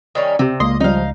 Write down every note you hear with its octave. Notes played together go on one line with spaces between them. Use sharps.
D#3 G3 C#4
C#2 C3 C4 G4
C#2 A#3 D#5 C6
C#3 F3 G3 D#4 F5